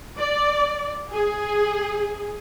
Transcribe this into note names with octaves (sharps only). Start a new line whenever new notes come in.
D5
G#4